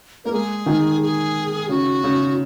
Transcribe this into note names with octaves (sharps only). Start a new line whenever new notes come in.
A#3 A#4
G#3 G#4
D#3
G#4
C#3 F#4
C#3